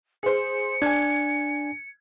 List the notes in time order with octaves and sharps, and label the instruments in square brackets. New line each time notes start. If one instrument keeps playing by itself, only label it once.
[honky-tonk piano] G#4 C5 [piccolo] C#7
[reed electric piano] D4 G#5 [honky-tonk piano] G#6